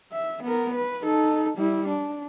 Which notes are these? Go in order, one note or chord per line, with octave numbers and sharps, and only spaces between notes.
E5
B3 A#4
B4
D#4 A4
G3 E4
D4